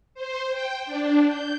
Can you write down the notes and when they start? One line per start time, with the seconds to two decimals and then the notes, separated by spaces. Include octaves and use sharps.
0.14 C5
0.51 G5
0.85 D4
1.25 G6